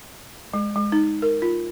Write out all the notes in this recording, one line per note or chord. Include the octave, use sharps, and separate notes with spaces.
G#3
G#3
D#4
A#4
F4